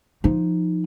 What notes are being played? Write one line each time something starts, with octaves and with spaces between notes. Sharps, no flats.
F3 D#4